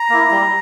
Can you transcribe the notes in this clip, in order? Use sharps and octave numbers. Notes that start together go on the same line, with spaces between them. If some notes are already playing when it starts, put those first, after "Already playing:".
Already playing: A#5
A#3 E4
G3